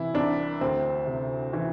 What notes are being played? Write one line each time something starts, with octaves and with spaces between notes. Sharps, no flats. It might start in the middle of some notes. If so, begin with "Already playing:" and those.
Already playing: C3 E3 E4
C2 D4
D2 C4
C3
E3